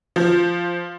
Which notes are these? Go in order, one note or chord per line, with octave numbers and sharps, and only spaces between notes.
F3